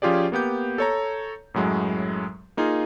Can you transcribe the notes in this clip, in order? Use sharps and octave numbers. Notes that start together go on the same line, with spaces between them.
F3 C#4 F4 G4 G#4 D5
A#3 B3 G4 G6
A4 C#5 A#5
F#2 A2 F#3 G#3
A#3 D#4 F4 G#4